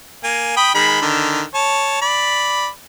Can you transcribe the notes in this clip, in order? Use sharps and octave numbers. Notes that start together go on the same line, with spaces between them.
A#3 G#5
G5 B5 D#6
D#3 G#3 B5
D3 D#3
C#5 A5
D5 B5